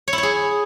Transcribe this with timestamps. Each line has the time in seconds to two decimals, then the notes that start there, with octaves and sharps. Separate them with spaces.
0.08 C#5
0.13 E4
0.18 C#5
0.23 G#4